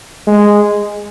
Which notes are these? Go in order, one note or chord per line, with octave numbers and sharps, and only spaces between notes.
G#3